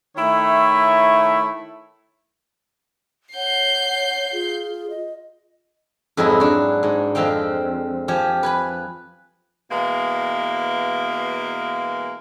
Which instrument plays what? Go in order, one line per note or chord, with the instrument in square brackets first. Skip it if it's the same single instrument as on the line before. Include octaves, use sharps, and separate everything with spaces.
[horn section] D#3 A3 E4 C#5
[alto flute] C#5 [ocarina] F#5 [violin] G6 C7
[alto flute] F4 [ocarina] G#4
[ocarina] D#5
[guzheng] F2 G#2 F#3 G#3 E4 G#4
D4 F#4
G#2
F2 G#3 C4 F5 G5
F3 G4 G#5
B4 G#5 B5
[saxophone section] B2 E3 G#3 A#3